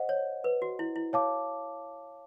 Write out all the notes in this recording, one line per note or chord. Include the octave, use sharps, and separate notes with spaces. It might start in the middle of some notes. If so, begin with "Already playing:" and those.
Already playing: C5 D#5 F#5
C#5
B4
F#4
E4
E4
C#5 F5 A5 D6